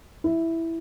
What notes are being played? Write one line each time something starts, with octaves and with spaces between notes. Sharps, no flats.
E4